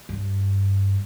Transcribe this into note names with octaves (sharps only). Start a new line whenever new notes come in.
G2